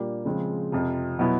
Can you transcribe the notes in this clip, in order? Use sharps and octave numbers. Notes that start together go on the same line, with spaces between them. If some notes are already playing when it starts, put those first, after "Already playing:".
Already playing: A#2 G3 A#3 D4 G4
C#3 F3 G#3 C4
F2 C3 F3
B2 F#3 B3 E4